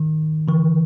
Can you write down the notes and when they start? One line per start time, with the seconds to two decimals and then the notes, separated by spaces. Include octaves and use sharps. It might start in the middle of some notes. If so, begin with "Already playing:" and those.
Already playing: D#3
0.48 D3 E3